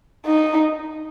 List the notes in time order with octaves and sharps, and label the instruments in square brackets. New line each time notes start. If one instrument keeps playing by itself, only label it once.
[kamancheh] D#4